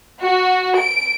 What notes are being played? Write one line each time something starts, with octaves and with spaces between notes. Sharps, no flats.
F#4
D7